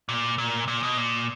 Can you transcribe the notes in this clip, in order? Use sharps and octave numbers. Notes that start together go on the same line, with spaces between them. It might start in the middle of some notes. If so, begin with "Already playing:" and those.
A#2
A#2
A#2
B2
A#2